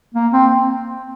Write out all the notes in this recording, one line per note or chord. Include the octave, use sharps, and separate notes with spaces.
A#3
C4